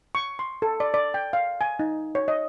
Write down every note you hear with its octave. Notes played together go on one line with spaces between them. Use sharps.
C#6
C6
A4
D5
D5
G5
F5
G#5
D#4
C#5
D#5